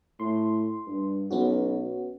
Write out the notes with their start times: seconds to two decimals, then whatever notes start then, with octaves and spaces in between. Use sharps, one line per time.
0.20 A2 C6
0.87 G2
1.31 B1 B3 C#4 F#4